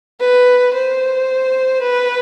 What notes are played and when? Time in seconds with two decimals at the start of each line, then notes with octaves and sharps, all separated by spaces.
0.20 B4
0.73 C5
1.81 B4